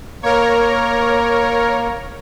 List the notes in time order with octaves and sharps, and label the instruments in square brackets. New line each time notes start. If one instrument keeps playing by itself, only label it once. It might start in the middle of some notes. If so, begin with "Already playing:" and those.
[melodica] A#3 [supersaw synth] A#4 C#5